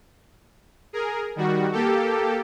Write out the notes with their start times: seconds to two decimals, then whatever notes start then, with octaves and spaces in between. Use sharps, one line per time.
0.93 G#4 A#4
1.36 D#3 G3 F#4
1.72 A#3 G4 A4